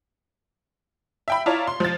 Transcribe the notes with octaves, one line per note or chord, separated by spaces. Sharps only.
E5 G5 B5
E4 F4 C#5 D5 A5 A#5
C6
F3 A6